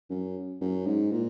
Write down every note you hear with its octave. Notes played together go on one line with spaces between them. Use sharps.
F#2
F#2
G#2
A#2